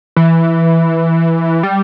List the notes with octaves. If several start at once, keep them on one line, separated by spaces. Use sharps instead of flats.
E3
G3